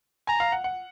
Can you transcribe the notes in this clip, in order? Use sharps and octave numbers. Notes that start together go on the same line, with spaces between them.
G#5 A#5
F5
F#5
F#5